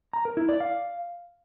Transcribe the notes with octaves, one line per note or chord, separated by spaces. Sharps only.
A#5
A#4
E4
D5
F5